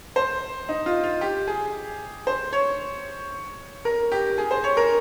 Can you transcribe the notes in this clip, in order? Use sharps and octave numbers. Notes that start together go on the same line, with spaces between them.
C5
D#4
F4
F4
G4
G#4
C5
C#5
A#4
G4
G#4
C5
C#5
A#4